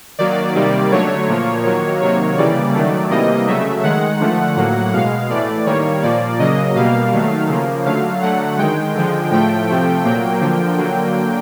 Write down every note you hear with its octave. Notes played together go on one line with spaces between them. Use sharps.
D#3 F#3 A#3 D5
C3 D#3 G3 A#3
D3 F#3 A3 C#5
A#2 F3 A#3
D#3 F#3 A#3
C3 D#3 F#3 A#3 C#5
C#3 E3 G3 A#3 D5
D#3 F#3 A3
C3 E3 G3 A#3 D#5
C#3 F#3 A3 E5
D#3 G#3 F#5
D3 F3 A3
A2 F#3 A#3
B2 G#3 F5
A2 E3 A3 D5
D#3 G3 A#3 C#5
A#2 F3 A#3 D5
C#3 F#3 A#3 D#5
B2 G3 A#3 F5
D#3 F#3 A3
C#3 F3 A#3
D3 F#3 A3 F5
D3 F#3 A3 F#5
D#3 G#3 G5
D3 F3 G#3
A2 F3 A3 G5
C3 F3 A3
A#2 F#3 A#3 G5
D3 F3 A#3
D3 F#3 A#3